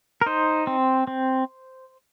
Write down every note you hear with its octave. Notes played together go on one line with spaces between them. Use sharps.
A#4
D#4 C5
C4
C4